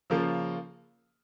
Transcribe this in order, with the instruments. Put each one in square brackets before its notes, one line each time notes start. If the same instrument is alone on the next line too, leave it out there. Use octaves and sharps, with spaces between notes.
[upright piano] C#3 F3 A#3 F4